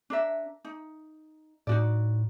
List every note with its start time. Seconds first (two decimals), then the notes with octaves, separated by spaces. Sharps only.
0.10 D4 A#4 E5
0.65 D#4
1.67 A2 D#4 F#4 D5